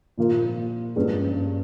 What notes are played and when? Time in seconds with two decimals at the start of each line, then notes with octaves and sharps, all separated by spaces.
0.17 A#2 F3 A#3 F4 A#4
0.96 G2 F3 A#3 C#4 G#4